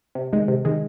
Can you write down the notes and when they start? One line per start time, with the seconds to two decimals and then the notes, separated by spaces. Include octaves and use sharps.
0.15 C3
0.33 D#3 G#3
0.48 C3
0.65 D#3 G#3